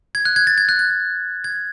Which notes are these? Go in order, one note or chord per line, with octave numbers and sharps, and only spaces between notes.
G#6
F#6
G#6
A6
G#6
F#6
G#6
G#6